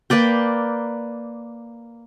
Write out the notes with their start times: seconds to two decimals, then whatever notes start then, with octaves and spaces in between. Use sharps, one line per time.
0.10 A#3 B4 D5 G5